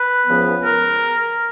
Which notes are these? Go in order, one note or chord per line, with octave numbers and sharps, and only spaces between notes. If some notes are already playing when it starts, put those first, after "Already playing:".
Already playing: B4
C#2 C#3 F3 B3
A#4